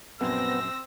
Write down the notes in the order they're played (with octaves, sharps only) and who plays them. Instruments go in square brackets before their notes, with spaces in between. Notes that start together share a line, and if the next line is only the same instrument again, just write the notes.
[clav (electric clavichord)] A#1 F#2 [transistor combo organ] B3 [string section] C4 A#6 [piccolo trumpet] E6